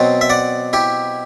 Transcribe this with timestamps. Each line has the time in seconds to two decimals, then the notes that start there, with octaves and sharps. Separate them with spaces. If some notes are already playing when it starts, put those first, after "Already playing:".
Already playing: B2 F#3 C4 F#5 A5
0.21 E5
0.30 D5 F#5
0.73 E4 G4